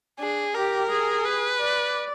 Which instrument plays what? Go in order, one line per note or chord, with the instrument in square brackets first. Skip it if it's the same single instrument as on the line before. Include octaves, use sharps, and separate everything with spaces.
[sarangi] D4 [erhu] G#4
[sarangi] G4 [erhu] A#4
[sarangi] G#4
[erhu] B4
[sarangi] D5